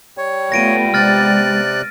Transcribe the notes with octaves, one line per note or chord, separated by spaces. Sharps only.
G3 C#5
A3 B3 F4 A#6 D7 D#7
C3 G#3 B3 D5 F6 F#6 A6